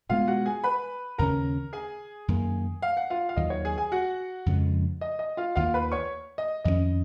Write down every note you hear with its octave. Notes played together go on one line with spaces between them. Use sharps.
B2 G#3 B3 F4 F5
F#4 F#5
G#4 G#5
B4 B5
D#2 C#3 G#3 C#4 A#4 A#5
G#4 G#5
F#2 D#3 A#3
F5
F#5
F4 F5
F5
D#2 D#3 F#3 D#5
C#5
G#4 G#5
G#4 G#5
F#4 F#5
F2 C#3 F3 G#3
D#5
D#5
F4 F5
D#2 D#3 A#3 F4 F5
B4 B5
C#5 C#6
D#5
F2 D#3 A#3 C#4 D#5